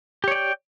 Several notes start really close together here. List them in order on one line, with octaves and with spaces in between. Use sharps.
G4 C#5 D5 G5